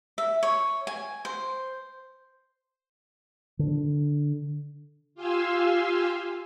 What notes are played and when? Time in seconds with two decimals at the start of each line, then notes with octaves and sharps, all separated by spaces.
0.18 E5
0.43 C#5
0.87 G#5
1.25 C5
3.59 D3
5.15 F4 G4 F5 G#5 C6 E6